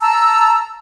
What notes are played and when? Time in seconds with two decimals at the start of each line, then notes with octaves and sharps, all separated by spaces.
0.01 A5 A#5 E6